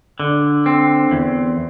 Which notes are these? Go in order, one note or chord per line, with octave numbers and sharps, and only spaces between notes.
D3
C4
E2